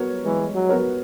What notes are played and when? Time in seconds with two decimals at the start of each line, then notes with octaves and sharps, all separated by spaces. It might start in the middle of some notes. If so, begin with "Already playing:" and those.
Already playing: B3 F#4 A#4 C#5
0.25 E3 G#3
0.54 F#3
0.69 B3 F#4 A#4 C#5